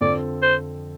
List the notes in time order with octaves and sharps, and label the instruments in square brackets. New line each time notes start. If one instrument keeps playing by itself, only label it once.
[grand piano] F2 D3 F3 C4 A4 [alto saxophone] D5
[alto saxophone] C5